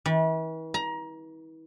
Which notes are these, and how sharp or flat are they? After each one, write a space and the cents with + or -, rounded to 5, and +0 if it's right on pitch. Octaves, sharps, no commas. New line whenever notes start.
E3 -40
A#5 +25